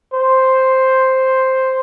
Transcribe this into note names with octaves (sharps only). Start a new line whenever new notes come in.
C5